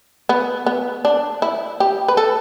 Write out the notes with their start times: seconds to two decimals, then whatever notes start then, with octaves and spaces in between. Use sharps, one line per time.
0.29 B3
0.66 B3
1.05 D4
1.42 E4
1.80 G4
2.08 B4
2.17 A4